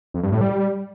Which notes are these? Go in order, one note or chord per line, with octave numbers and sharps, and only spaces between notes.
F2
G2
A2
G3